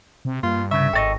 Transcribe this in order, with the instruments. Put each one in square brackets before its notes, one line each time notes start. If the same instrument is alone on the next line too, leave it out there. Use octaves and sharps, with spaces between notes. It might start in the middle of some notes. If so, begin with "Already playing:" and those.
[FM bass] C3
[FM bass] G2 [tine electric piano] A#3 [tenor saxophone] F4
[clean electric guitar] C2 C#3 [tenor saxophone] E5 [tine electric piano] C#6
[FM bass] G#1 [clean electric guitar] A4 D5 D#5 [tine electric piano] G5 C#6